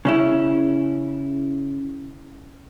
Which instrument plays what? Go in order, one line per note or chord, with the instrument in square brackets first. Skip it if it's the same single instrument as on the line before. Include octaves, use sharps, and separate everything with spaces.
[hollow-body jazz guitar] C#3 C#4 E4